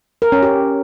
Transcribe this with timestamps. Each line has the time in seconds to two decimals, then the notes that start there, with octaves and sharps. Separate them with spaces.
0.22 A#4
0.32 C#4
0.43 G4